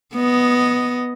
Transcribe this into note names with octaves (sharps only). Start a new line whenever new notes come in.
B3 D#5